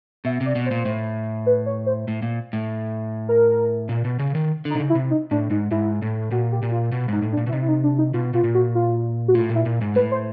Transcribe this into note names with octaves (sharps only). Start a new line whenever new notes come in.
B2 E5
C3
D5
B2
C5
A#2
A2
B4
C#5
C5
A2
A#2
A2
A#4
A#2
B2
C#3
D#3
D3 D#4
C3
C#3
E4
C3
D#4
A2 D4
G#2 D#4
G#2 E4
A2
A#2 F#4
G4
A#2
F4
B2
G#2 D#4
A2
D4
A#2
B2 E4
C3 D#4
E4
D#4
D4
D#4
B2 F4
B2 F4
A#2
F#4
F4
F#4
A2 F4
A#2
E4
A#2
G#2
A2 B4
C5